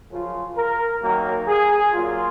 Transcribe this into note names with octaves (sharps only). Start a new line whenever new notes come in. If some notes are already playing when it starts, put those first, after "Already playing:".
F#2 C#3 F3 F4
A#4
F#2 D#3 F#3 A#3 A#4
G#4
A#2 F#3 A#3 F4